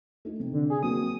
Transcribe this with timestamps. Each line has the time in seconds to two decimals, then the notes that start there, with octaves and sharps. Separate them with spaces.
0.25 A3 D#4
0.40 C3
0.53 D3
0.70 G#4
0.83 F#3 A#3 C4 D#6